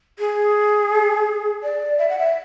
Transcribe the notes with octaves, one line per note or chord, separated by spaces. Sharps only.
G#4
D5
E5
F#5
E5